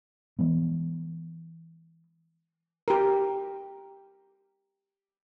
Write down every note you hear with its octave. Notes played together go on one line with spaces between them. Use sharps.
E3 G#3 B3
G4 A#4